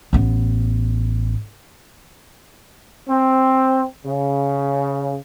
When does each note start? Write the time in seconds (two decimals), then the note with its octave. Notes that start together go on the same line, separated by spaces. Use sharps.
0.13 A1 B3
3.08 C4
4.06 C#3